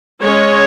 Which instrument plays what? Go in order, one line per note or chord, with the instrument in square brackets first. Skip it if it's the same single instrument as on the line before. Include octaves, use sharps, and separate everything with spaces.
[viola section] G#3 C#4 C#5